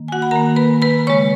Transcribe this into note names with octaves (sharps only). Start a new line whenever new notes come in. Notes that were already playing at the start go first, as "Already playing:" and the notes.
Already playing: D#3 A#3
G#5
F#4 F#5
B5
D#3 A#3 A#4 A#5
B4 B5
B4 B5
C#3 G#3 C#5 C#6